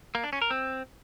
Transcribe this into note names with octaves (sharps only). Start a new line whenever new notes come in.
A#3
D4
C#4
A#4
C4